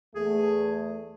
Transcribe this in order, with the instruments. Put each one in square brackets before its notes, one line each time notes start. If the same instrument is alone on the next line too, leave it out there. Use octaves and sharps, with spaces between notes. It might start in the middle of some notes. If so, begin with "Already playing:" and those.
[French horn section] E2 A3 [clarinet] G#4